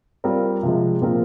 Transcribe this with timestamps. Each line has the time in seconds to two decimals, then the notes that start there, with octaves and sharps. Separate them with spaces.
0.24 G3 C4 F4 A#4
0.63 C3 F3 G#3
1.01 A#2 F3 C4 F4 A#4